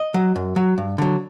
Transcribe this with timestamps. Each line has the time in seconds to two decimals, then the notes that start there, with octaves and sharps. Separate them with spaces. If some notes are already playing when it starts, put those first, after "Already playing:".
Already playing: D#5
0.14 F#3
0.36 F#2
0.56 F#3
0.78 G2
0.98 D3 F#3